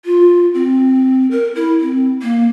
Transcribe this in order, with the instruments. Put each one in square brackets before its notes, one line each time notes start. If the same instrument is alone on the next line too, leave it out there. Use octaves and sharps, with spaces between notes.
[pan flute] F4
C4
A#4
E4
C4
A#3